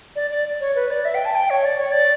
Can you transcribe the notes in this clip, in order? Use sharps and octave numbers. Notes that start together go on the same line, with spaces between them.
D5
D5
C#5
B4
D5
E5
G5
A5
G5
C#5
D5
C#5
D5